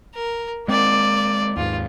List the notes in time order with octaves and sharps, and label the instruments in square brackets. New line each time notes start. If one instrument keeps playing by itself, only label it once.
[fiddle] A#4
[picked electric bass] G#3 C4 [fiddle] A#3 D5
[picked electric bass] D#2 G#2 [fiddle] F4